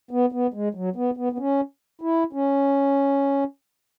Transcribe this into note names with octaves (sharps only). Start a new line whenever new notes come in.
B3
B3
G#3
F#3
B3
B3
B3
C#4
E4
C#4